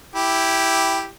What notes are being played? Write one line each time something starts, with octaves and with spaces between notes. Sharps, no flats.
E4 G4